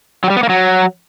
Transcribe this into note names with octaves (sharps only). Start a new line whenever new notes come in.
F#3
G3
B3
A#3
F#3